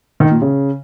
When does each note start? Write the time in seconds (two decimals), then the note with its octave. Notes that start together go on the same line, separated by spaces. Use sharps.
0.20 D#3
0.31 A#2
0.42 C#3